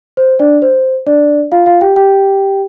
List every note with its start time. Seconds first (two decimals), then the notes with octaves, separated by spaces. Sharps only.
0.17 C5
0.39 D4 D5
0.62 C5
1.06 D4 D5
1.52 F4 F5
1.66 F4 F5
1.81 G4 G5
1.96 G4 G5